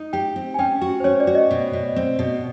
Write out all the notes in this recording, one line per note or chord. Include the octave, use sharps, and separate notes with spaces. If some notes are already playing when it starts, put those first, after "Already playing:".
Already playing: D#4
G4 G5
C4
G#5
C#4 G5
F#4
C5
C#4 C#5
D5
F#4
D#5
B2
B2
C4
B2